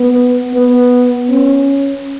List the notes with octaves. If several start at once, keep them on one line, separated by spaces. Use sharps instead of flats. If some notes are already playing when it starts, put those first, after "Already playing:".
Already playing: B3
B3
C#4